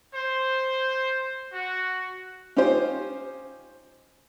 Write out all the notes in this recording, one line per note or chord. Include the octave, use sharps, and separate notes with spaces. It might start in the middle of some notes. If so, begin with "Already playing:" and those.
C5
F#4
C#4 D#4 F4 G4 C5